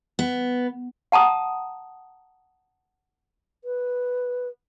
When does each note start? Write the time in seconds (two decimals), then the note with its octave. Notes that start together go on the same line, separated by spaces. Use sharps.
0.19 B3
1.12 F#5 A5 A#5 D#6
3.63 B4